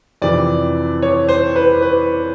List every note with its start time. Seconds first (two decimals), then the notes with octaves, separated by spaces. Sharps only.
0.22 F2 C3 E3 D5
1.02 C#5
1.29 C5
1.56 B4
1.82 B4